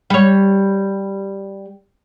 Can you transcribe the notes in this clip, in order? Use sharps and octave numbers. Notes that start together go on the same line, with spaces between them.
G3 C#5